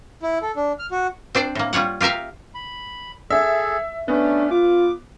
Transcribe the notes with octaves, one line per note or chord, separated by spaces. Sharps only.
E4
A4
D4
F6
F#4
C4 D4 C5 D5
A2 A#3
G3 F4 C#5 F#5
F4 G4 A#4 E5 F5
B5
G#4 A4 E5
A3 B3 C#4 D4
F4 D6